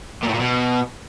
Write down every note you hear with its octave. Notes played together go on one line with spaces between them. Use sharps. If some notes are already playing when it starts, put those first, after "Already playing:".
A#2
A2
A#2
B2